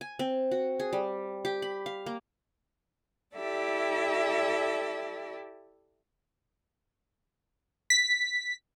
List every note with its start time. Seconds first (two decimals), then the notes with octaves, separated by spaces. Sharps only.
0.01 G#5
0.19 C4
0.51 F#4
0.80 G#4
0.93 G3
1.45 G4
1.62 B5
1.86 F5
2.06 A#3
3.35 E4 G4 A4 D5 E5
7.90 B6